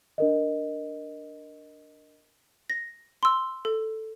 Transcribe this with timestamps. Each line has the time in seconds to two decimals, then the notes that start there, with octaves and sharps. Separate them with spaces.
0.18 D4 A#4 D#5
2.70 A#6
3.23 C6 E6
3.65 A4